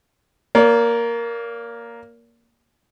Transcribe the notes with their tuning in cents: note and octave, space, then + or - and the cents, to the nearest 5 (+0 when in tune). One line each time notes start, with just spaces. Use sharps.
A#3 +5 D5 -45